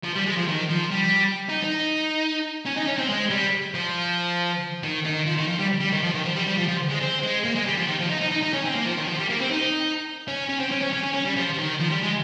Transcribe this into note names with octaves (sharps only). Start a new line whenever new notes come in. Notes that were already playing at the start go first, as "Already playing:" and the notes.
F3
G3
G#3
F3
D#3
F3
G3
D#4
D#4
C#4
D#4
C#4
C4
G#3
G3
F3
D#3
D#3
F3
D#3
F3
G3
G3
D#3
F3
D#3
F3
G3
G3
F3
F3
G#3
C4
G#3
A#3
G#3
G3
F3
D#3
F3
D#4
D#4
D#4
D#4
C#4
C4
A#3
F3
D#3
F3
G3
A#3
C4
D#4
C#4
C#4
C4
C#4
C#4
C#4
C#4
C#4
G3
F3
F3
D#3
F3
G3
G#3